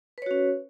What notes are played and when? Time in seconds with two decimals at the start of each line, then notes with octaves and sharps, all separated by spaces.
0.18 B4
0.22 C#5
0.26 F#4
0.31 C#4